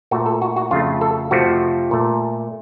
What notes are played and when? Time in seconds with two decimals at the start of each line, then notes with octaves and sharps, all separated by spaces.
0.11 A#2 A3 F#4
0.26 A4
0.42 F#4
0.56 F#4
0.71 F2 C#3 A3 F4
1.01 A4
1.31 F2 C3 F3 A3 F#4
1.91 A#2 A3